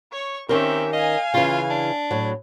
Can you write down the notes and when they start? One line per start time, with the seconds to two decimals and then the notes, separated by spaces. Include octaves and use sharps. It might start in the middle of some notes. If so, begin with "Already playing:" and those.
0.12 C#5 C#6
0.49 D#3 C4 C#4 G4 A#4 E5
0.93 D#5 F5 G#5
1.34 C#3 E3 F4
1.70 D4
2.11 A2 F#3